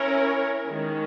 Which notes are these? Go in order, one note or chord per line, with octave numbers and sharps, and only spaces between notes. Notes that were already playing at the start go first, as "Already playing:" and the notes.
Already playing: C#4 E4 A#4 C#5
D#3 G#3 C#4